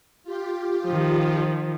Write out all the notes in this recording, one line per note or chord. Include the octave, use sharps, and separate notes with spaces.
F4 G4
D#3 F3